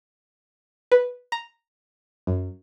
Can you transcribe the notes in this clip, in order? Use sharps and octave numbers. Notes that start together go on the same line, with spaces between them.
B4
A#5
F#2